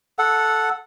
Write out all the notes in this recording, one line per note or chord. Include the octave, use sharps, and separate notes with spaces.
A4 F#5